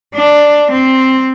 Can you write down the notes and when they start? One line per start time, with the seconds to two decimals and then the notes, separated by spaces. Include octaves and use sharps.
0.15 D4
0.71 C4